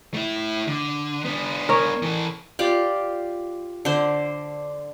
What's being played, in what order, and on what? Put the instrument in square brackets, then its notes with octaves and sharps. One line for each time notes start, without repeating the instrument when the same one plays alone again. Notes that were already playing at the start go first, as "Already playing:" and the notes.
[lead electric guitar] A3 E4
D3
B3 D4
[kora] A#4 C#5
[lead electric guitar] E3 A4
[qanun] F4 G4 D5
D3 C5